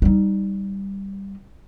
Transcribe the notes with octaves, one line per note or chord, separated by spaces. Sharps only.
G3 D#4